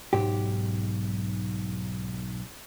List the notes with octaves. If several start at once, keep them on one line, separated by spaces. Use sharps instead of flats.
B1 G#2 G4